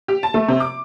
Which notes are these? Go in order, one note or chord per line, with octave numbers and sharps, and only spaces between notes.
G4
A5
A3
C3
D6